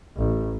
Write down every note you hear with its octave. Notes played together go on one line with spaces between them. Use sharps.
A1